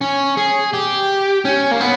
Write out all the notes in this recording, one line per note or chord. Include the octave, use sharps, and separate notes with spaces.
C#4
G#4
G4
C#4
A#3
B3